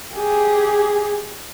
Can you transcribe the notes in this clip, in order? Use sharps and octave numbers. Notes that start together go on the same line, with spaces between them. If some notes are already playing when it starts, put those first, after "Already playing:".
G4 G#4